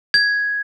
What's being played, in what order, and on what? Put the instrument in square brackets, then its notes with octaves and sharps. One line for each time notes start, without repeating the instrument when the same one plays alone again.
[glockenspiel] G#6